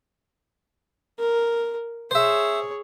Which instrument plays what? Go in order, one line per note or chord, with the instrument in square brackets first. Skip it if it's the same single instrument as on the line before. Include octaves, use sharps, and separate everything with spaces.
[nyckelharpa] A#4
[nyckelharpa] G#4 C#5 [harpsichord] C5 E5